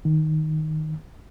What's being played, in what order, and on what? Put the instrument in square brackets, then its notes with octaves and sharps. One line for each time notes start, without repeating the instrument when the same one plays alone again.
[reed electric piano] D#3